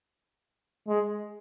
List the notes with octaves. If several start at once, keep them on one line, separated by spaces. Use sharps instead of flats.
G#3